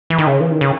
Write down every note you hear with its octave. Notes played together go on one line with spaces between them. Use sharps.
E3
D#3
C#3
E3
D#3
C#3